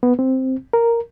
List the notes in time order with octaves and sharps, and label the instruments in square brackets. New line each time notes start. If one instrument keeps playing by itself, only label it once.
[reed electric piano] B3
C4
A#4